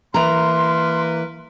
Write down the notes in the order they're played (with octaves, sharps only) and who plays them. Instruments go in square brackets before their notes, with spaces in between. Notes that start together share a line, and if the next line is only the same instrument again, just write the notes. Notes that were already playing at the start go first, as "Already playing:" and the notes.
[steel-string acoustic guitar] E3 A#5 [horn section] A#3 A#4 B4 [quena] C6